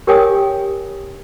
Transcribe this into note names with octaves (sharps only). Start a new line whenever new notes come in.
G4 A#4 C#5 G5 G#5 D#6